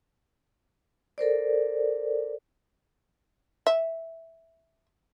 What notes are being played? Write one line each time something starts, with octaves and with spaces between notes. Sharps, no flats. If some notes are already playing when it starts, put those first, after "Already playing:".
A4 A#4 C5 D5
E5